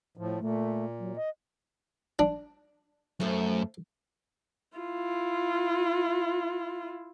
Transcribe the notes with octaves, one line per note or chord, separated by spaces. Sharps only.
A2 F3
A#2 A3
F#3
D#5
D4
F#2 F3 A3
E4 F4